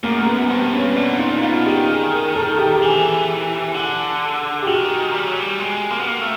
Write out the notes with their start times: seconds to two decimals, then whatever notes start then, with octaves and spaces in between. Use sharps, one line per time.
0.03 F#2 A#3
0.17 A#3
0.26 B3
0.50 G2 C4
0.73 C#4
0.96 B2 D4
1.14 D4
1.19 A#2 D#4
1.42 B2 F4
1.66 D#3 G4
1.89 G#4
2.12 A#4
2.35 A4
2.58 G4
2.75 G4
2.82 E3 G#4
3.74 D3
4.62 G4
4.67 D#3 F#4
5.13 G3
5.26 F#3
5.40 G3
5.59 G#3
5.90 A#3
5.99 B3
6.07 A#3
6.21 A3